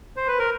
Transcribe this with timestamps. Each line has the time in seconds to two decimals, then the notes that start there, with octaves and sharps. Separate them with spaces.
0.17 C5
0.27 B4
0.39 A#4